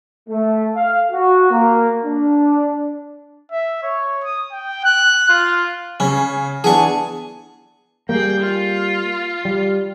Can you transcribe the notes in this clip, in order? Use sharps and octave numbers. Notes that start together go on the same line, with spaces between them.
A3
F5
F#4
A#3
D4
E5
C#5
D#6
G5
F#6
F4
C#3 C#4
E3 B3 D4 G#4 A5 C#6
G3 A#3 G#4 G5
F4
G3